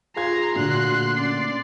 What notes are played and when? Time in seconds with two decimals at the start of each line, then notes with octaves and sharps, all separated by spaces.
0.16 F4 G#4 F5 A#5 C6 G#6
0.54 A#2 D3 A3 F#4 C6 F#6
1.15 C#4 D5 C6